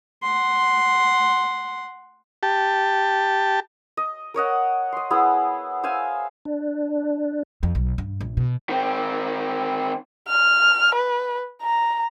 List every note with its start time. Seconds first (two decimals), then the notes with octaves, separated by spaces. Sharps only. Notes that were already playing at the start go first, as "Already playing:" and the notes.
0.23 F#5 C6
2.43 G4 A5
3.97 D#5
4.34 A#4 C#5 D#5 F#5
4.92 D#5 C6
5.10 B3 E4 G#4
5.83 C5 E5 F5 G#5
6.45 D4
7.63 F2
7.75 B1
7.98 G2
8.21 A#1
8.37 B2
8.69 D#3 C4
10.27 F6
10.94 B4
11.62 A#5